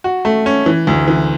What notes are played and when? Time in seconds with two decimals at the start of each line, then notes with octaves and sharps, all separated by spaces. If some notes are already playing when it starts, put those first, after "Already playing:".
0.04 F#4
0.25 A3
0.46 C#4
0.66 E3
0.87 D2
1.08 E3